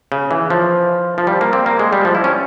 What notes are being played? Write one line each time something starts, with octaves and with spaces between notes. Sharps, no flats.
C#3
E3
F3
F3
G3
A#3
C4
A#3
G#3
G3
F3
E4
C#4